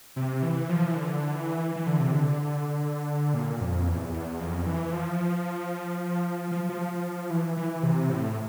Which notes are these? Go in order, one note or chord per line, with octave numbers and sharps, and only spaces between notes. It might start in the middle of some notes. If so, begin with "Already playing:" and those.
C3
E3
F3
E3
D3
E3
E3
D3
C3
D3
A#2
F2
E2
E2
F2
E3
F3
F3
F3
E3
E3
C3
A2